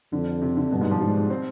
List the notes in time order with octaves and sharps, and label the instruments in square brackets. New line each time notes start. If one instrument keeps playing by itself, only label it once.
[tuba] F2 [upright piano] D3
[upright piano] C3
D3
[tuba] G2 [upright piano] B2
[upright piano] G#2
F3
[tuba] G#2 [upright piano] G3
[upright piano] C4